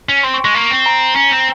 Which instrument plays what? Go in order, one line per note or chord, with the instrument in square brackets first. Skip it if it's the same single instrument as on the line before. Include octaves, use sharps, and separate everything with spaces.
[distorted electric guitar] C#4
[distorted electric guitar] C4 [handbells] C6
[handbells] C#6
[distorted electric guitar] G#3 [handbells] C#6
[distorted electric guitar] A#3
C4
[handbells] A#5
A#5
[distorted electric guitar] C#4
C4